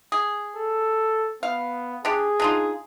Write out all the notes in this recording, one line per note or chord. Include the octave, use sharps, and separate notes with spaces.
G#4
A4
B3 F5
D4 G4 G#4
D4 D#4 F4